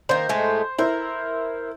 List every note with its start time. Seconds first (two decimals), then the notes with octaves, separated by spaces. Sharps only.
0.09 D#3 A#3 C5
0.29 A2 G#3 A3
0.79 E4 A#4 C5